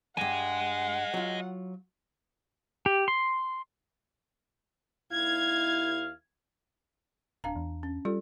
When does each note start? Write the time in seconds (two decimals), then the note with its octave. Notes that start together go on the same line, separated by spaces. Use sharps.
0.17 E2 G2 D#5 F#5 G#5
1.14 F#3 F4
2.86 G4
3.08 C6
5.12 D#2 E4 F5 G#6
7.44 D1 D4 F5 A#5
7.56 E2
7.83 C#4
8.05 G3 F4 A4 D5